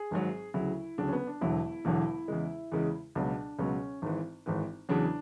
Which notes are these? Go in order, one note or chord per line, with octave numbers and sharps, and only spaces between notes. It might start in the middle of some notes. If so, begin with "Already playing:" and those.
Already playing: G#4
G#1 G#2 F#3
D2 C#3 F#3 E4
D2 C#3 F#3 D4
C#4
B3
D4
E1 E2 D3 F#3 E4
E1 E2 D3 F#3
E2 C#3 G#3
E2 C#3 G#3
C#2 B2 F#3 D4
C#2 B2 F#3 C#4
G#1 G#2 E3
G#1 G#2 E3
E2 C#3 F#3 D4